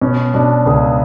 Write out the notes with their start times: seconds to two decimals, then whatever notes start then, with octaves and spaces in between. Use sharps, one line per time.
0.01 B2 C#4
0.34 B2 D4
0.66 C#2 G#4